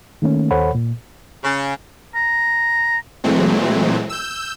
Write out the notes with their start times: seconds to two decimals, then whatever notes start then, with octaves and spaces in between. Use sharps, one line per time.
0.22 D#3 A3 A#3 C#4
0.51 D#2 A4 C5 C#5 F#5 B5
0.75 A#2
1.44 C#3
2.15 A#5
3.24 A#2 E3 F#3 G#3 A3 C4
4.09 E6 G6